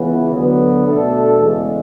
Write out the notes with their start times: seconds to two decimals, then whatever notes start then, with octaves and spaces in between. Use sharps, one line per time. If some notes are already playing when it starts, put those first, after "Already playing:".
Already playing: C#2 C#3 E3 B3
0.33 D2 D3 F#3 B3
0.86 B2 A3 D4 A4
1.39 E2 C#3 G#3